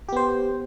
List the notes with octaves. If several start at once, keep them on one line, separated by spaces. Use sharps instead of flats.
B3 G4 C5